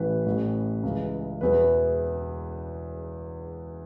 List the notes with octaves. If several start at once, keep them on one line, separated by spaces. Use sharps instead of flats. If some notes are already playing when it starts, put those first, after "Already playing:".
Already playing: A1 A2 E3 B4
A1 A2 E3
C#2 C#3 E3
E1 E2 E3 B4